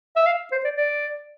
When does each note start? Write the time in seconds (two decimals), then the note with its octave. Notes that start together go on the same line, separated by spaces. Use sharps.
0.16 E5
0.26 F5
0.52 C5
0.65 D5
0.77 D5